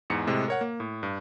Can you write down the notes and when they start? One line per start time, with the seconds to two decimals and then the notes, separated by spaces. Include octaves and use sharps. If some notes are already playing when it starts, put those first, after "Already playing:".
0.10 E2 G#2 C#7
0.27 A2 C3 G#3
0.48 A#4 C#5 F#5
0.61 A#3
0.80 A2
1.03 G2